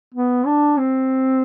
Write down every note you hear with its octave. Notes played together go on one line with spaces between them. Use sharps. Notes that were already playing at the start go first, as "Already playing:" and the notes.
B3
D4
C4